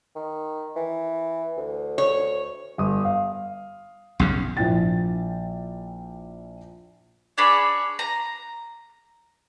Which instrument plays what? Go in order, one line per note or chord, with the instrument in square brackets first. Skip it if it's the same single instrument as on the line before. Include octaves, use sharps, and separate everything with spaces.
[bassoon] D#3
E3
D2
[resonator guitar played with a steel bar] C#5
[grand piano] G1 D#6
F5
[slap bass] B1 F#2 C#3
[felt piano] A#1 F3 E4 G5 A6
[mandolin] D4 G#4 C#5 B5
A#5